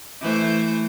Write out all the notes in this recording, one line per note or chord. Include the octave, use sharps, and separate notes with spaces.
E3 A3 C5